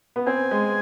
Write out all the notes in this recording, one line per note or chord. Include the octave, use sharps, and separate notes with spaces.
B3
C4 G#5
G#3